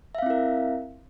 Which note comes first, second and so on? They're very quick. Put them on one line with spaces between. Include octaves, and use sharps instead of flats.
E5 F5 C4 E4 A#4